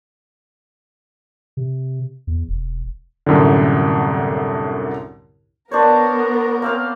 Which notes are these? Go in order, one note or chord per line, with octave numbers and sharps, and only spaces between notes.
C3
E2
E1
C2 F#2 A2 D3
B3 D4 A#4 C5 C#5
A#3 C4 F5